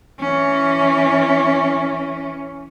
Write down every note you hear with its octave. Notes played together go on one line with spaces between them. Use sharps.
E3 C#4